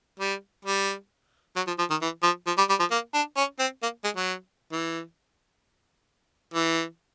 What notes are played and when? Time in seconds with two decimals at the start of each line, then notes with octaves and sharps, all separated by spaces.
0.20 G3
0.65 G3
1.56 F#3
1.67 F3
1.79 F3
1.90 D#3
2.01 E3
2.23 F3
2.47 F3
2.58 G3
2.69 G3
2.80 F3
2.91 A#3
3.14 D4
3.37 C#4
3.59 C4
3.83 A#3
4.04 G#3
4.16 F#3
4.72 E3
6.54 E3